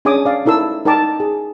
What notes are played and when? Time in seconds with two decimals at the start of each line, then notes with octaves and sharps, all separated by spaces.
0.05 C#4 D4 G#4 G#5 D6 D#6
0.26 D5 F5
0.46 D#4 E4 A4 A#4 E6
0.85 D#4 A#4 D5 G5 A5 D6
1.20 G#4